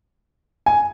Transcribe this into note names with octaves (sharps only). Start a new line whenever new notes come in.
G#5